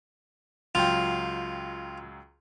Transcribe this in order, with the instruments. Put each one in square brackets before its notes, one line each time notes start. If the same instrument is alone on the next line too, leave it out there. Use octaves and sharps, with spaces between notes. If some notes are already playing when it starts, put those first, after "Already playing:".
[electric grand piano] C#2 F#3 G5 [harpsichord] F4